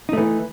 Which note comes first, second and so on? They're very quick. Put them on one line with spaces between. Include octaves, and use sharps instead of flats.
D#4 A3 E3